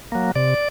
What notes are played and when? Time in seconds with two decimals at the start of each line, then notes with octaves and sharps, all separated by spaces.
0.12 F#3 A#3
0.35 C3 D5